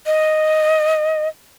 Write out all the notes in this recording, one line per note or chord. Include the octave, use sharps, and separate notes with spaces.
D#5